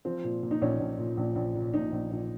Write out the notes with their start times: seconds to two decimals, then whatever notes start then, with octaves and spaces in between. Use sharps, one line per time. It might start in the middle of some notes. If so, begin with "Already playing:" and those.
0.05 F3 C4
0.24 A#2
0.43 A#2
0.51 D#4
0.62 A#1 C#4
0.80 A#1
0.99 A#2
1.17 A#1
1.36 A#1
1.55 A#2
1.73 A#1 D#4
1.92 A#1
2.11 A#1